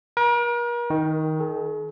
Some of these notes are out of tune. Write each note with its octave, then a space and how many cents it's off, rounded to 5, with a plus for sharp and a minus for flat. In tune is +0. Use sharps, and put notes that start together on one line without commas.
A#4 +40
D#3 +10
G#4 +45